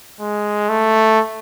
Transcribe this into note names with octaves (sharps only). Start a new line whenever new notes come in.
G#3
A3